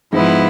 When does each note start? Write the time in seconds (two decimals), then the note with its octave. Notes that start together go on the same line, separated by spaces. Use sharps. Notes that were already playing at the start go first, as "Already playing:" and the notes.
0.13 G#2 F3 B3 E4